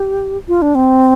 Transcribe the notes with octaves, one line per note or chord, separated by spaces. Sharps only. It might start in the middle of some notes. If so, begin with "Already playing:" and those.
Already playing: G4
F4
D4
C4